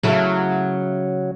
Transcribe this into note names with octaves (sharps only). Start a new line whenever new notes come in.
C#3 F#3 A3 E4